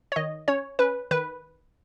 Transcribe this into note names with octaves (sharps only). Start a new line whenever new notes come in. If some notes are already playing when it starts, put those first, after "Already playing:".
C#5
D#3 D#5
C#4 C#5
C#4 B4
D#3 B4